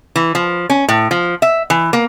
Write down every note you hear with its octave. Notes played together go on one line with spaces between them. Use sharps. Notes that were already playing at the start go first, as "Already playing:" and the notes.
E3
F3
C#4
A2
F3
E5
E3
A#3